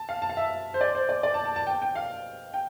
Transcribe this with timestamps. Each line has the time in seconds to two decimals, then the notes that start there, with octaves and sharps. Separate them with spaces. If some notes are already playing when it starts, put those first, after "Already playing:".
Already playing: A5
0.09 F5
0.22 A5
0.29 F5
0.37 E5
0.74 C5
0.81 D5
0.95 C5
1.09 D5
1.23 D5
1.34 A5
1.45 A5
1.56 A5
1.67 G5
1.82 G5
1.95 F5
2.54 G5